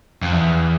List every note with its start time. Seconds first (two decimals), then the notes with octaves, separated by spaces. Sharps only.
0.22 F2
0.33 E2